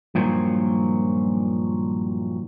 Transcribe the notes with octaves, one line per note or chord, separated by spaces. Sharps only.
G2 A#2 D#3 F3 F#3